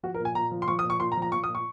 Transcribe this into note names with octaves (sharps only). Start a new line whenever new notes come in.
F3 F#4
A#4
A#2
G#5
A#2 A#5
F3
C6
F3 C#6
D#6
A#2
C#6
A#2 C6
A#5
F3
A#5
F3 C#6
D#6
A#2
C#6